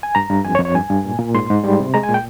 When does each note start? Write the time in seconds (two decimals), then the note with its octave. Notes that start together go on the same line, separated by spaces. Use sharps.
0.03 G#5
0.15 G2 A#5
0.29 G2
0.45 F2 G#5
0.55 C#5
0.59 F2
0.65 C#5
0.75 G2 G#5
0.89 G2
1.05 A#2
1.19 A#2
1.35 G#2 C6
1.50 G#2
1.64 G3
1.80 C3
1.94 G#3 A#5
2.03 G#5
2.09 A#2
2.14 G5